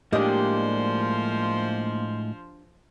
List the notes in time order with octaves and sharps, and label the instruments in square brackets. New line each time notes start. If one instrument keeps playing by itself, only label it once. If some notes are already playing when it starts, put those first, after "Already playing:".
[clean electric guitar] A2 G#3 [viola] F3 C5 [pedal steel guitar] A#3 [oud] D4 G4 D#5